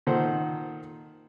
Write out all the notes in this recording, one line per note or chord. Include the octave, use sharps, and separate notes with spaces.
A#2 D#3 A4 C5 F#5